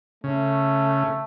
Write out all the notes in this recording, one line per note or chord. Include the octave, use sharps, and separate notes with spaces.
C#3 A3